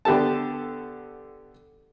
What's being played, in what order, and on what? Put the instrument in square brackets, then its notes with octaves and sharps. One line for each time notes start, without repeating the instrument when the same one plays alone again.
[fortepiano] D3 B3 G4 A4 A5